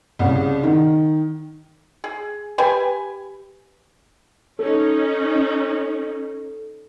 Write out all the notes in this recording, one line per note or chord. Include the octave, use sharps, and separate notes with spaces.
C2 C#3
D#3
G#4
G4 B4 G#5
C#4 D#4 A4